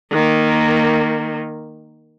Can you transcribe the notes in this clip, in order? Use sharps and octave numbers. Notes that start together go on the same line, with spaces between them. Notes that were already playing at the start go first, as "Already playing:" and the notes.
D#3 A#3